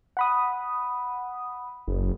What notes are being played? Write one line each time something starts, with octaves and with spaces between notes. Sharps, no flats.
F#5 B5 D#6
F#1